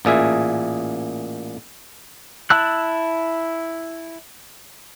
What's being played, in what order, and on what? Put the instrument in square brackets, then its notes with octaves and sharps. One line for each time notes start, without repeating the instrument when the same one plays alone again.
[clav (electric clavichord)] A1 A#2 G#4 E5
[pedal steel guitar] E4 A5 E6 F#6